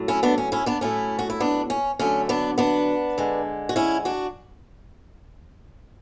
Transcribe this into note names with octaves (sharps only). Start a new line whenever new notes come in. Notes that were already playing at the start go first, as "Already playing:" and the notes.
Already playing: A2 F#3 A3
C#4 E4
B3 D4
C#4
C#4 E4
B3 D4
A2 F#3 A3 C#4 E4
F#4
E4
B3 D4
C#4
D3 F#3 A3 C#4
B3 D4
B3 D4
D3 G#3
F#4
C#4 E4
D4 F#4